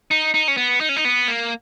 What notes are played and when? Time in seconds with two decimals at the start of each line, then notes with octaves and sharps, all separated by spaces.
0.11 D#4
0.34 D#4
0.48 C#4
0.57 B3
0.81 D#4
0.89 C#4
0.97 D#4
1.05 B3
1.28 A#3